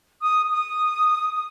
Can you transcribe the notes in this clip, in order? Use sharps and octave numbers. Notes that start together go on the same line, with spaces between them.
D#6
D#6